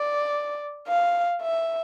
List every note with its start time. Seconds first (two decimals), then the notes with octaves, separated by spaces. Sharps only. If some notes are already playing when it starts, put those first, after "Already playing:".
Already playing: D5
0.88 F5
1.42 E5